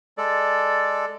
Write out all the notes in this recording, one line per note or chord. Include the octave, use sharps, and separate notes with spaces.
G#3 A4 D5